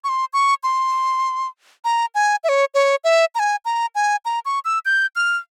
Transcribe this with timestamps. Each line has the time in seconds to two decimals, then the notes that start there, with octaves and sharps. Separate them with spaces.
0.04 C#6
0.09 C6
0.33 C#6
0.63 C6
1.85 A#5
2.15 G#5
2.44 E5
2.49 C#5
2.74 C#5
3.04 E5
3.35 A#5
3.39 G#5
3.65 A#5
3.95 G#5
4.25 A#5
4.45 C#6
4.65 E6
4.85 G6
5.16 F6